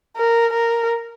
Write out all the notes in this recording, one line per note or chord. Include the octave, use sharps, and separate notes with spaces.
A#4
A#4